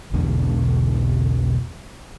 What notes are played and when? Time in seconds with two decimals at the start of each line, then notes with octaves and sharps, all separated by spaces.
0.12 B1 E2 B2 D3